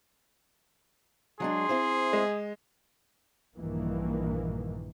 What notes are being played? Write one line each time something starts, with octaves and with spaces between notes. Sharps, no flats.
F#3 G#3 D4 G#4 C6
C4 E4 C5
G#3
A#1 G2 D#3 E3 A#3